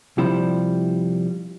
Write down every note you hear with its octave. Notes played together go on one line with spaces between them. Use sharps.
C3 F3 G3 E4